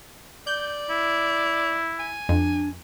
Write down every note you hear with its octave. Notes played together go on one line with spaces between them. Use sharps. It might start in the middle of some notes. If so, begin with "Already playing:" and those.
D5 G6
E4
G#5
F2 D4